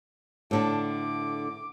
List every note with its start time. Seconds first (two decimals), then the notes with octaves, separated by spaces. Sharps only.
0.51 A2 D3 D4 A5 D6
0.83 D6